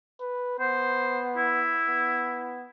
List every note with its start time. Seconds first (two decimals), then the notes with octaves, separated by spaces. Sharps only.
0.20 B4
0.59 B3 C5
1.37 E4
1.89 B3